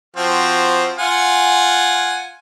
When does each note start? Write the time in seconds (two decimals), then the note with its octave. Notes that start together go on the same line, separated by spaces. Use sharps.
0.16 F3 C4 F#4
0.98 F4 F#5 G#5